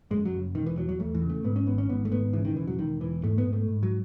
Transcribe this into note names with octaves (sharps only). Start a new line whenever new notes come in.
F#2 G#3
F#3
F#1
E1 D#3
E3
E2 F#3
F#3
E2 A3
E3
C#3
A3
G#2 B3
C#4
G#1 B3
C#4
G#2 B3
A3
G#1 B3
C#3 E3
D#3
E1 E3
F#3
E1 D#3
E2 E3
G#2 A3
B3
G#2
A3
G#2
F#3